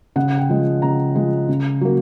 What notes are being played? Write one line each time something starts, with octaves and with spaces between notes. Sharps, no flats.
C#3 F#5
G5
F3 G#3
C#3 A#5
F3 G#3
C#3
F#3 A#3